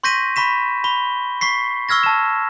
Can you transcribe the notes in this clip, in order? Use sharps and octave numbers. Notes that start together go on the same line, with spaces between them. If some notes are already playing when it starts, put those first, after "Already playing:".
C6 C#6 G6 A#6 B6 D#7
B5 C#6 B6 E7
B5 G7
C#6 B6 C7
C#6 E6 F6 G#6 A#6
A5 E7